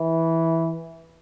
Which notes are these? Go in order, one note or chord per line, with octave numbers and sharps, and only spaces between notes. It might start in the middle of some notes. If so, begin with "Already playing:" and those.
Already playing: E3